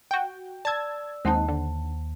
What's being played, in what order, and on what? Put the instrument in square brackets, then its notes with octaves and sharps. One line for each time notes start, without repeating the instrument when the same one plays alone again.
[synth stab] F#4 G5
[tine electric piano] D5 E6 [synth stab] A5 G#6
[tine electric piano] D#2 [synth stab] G#3 C4 D#4 [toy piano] C5 F#5 A5
[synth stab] D3